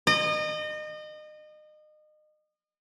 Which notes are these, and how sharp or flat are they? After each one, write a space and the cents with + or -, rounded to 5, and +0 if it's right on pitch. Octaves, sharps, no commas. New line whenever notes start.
D#5 -30